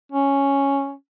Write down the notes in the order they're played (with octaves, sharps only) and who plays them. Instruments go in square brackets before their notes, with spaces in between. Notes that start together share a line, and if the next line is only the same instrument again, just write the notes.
[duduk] C#4